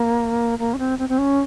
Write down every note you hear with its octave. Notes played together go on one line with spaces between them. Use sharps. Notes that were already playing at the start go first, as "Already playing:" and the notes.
Already playing: A#3
A#3
C#4
C4
C4
C4
C#4